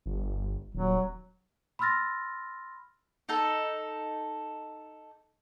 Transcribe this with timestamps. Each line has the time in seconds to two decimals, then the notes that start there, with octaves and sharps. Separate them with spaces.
0.06 G1
0.74 D#1 F#3
1.79 B5 C6 E6 F6 A6 A#6
3.29 D#4 A4